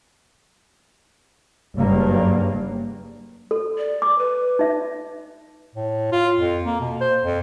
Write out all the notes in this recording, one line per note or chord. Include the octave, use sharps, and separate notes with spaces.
F#1 G2 F#3 G3 A#3
A4
D5
D6
B4
D#4 E5
A2
F4
F2
A#3
B2
C5
F2